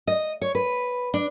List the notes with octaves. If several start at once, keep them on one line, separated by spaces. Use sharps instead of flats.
D#5
C#5
B4
D4